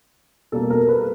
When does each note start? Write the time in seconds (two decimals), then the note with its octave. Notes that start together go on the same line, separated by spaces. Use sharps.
0.52 B2 G3 A#3 A4
0.70 A#4
0.89 B4